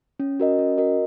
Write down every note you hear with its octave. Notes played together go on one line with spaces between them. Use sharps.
C#4
F#4 A#4 D#5
C#4
F#4 A#4 D#5